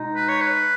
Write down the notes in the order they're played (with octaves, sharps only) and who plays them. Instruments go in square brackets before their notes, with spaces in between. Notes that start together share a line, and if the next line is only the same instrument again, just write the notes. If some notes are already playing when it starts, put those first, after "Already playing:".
Already playing: [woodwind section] B2 G#3 D#4
[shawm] B4
C#5
B4